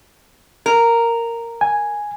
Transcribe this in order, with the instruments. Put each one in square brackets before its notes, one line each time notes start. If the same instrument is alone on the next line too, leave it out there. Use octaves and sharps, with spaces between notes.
[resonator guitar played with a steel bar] A#4
[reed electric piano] G#5